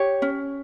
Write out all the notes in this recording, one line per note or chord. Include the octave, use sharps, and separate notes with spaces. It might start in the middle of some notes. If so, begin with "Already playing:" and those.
Already playing: G4 C#5
C#4